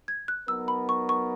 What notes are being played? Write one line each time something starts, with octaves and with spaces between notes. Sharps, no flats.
G#6
F#6
F#3 B3 D#4 A#4 E6
B5
C#6
C#6